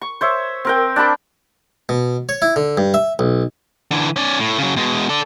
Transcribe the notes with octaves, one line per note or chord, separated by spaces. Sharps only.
C#6
C5 C#5 E5
C4 A#4 G5
D4 A5 B5 D6
B2
C#5
E4
D3
G2
E5
B1
D3 E3
C#4 D5
A2
C#3 F#3
B2 G#3
A4 D5